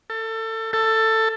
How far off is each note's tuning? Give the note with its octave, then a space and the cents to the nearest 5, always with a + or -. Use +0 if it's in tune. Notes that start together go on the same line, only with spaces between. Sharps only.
A4 +25
A4 +15